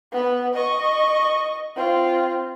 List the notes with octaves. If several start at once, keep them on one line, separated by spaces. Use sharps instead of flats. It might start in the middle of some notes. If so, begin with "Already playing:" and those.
B3 B4
D#5 C#6
C4 F4